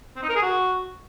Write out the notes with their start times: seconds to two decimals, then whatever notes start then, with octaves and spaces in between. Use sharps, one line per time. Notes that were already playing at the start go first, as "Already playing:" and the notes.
0.16 C4
0.23 D#4
0.29 A#4
0.36 G#4
0.42 F#4